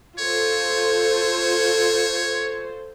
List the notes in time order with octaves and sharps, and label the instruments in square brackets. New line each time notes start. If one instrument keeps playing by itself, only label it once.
[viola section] F4 A4 C5 [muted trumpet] C#5